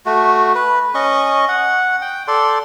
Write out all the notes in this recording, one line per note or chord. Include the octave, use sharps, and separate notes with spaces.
A3 F#4
B4
C#4 D#5 C#6
F#5
G5
A4 D5 C6